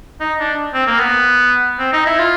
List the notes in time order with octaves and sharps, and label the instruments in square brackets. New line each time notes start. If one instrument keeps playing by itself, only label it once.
[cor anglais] D#4
D4
C4
A#3
B3
C4
D#4
E4
F4